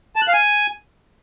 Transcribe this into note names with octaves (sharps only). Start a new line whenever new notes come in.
A5
F#6
F5
G#5